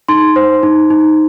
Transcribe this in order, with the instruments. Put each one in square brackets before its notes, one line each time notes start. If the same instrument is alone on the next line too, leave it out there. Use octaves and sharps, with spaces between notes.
[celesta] D#4 C6
C5
D#4
D#4